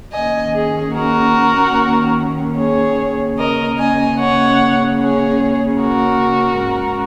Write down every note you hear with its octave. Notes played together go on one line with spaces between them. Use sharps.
D#2 D#3 A#3 C#4 D#5 G#5
G#4
F#4 A#4
G#4 C#5
C#3 A#3 C#4 A#4 D#5
D#5 G#5
C#5 F#5
G#4 C#5
F#4 A#4
G#2 G#3 C#4